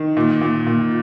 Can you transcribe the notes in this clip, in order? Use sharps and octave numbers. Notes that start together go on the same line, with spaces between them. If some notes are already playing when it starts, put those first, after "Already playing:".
Already playing: D#3
A#2
A#2
A#2